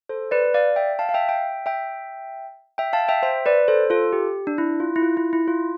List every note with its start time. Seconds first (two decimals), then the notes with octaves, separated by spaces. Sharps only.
0.09 A4 C5
0.31 B4 D5
0.54 D5 F5
0.76 E5 G5
0.99 F5 A5
1.09 F5
1.14 E5 G5
1.29 E5 G5
1.66 E5 G5
2.78 E5 G5
2.93 F5 A5
3.08 E5 G5
3.23 C5 E5
3.46 B4 D5
3.68 A4 C5
3.90 F4 A4
4.13 G4
4.47 D4
4.58 E4
4.80 F4
4.96 E4
5.02 F4
5.17 E4
5.33 E4
5.48 F4